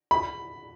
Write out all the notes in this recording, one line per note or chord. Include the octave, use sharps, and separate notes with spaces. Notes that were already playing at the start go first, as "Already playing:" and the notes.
B5